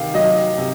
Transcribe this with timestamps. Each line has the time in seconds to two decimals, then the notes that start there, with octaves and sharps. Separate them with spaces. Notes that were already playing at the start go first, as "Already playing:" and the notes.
Already playing: C3 D#3 F5
0.14 F#3 D#5
0.58 C3